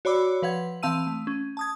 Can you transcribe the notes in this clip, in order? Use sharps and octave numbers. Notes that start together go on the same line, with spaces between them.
F#4 C#5 D5 B5 D6 E6
F3 B4 F5 F#5 G#6
E3 C4 F5 A5 E6 D#7
A3
C#4
A5 D#6 G#6